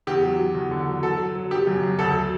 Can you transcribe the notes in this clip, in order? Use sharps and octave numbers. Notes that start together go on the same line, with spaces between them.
E2 G4
F#3
F#3
E2
D3
F#3
F#3 A4
F#3
F#3
F#3 G4
F#2
F#2
D2 A4
F#3